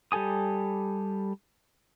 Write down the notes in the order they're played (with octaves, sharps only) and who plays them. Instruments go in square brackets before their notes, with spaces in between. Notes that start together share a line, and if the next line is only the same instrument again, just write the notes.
[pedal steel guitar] G3 G4 A4 G#5 D#6